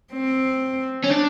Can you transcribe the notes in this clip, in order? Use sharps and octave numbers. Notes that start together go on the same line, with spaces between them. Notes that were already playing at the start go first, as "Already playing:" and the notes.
C4
C#4
D4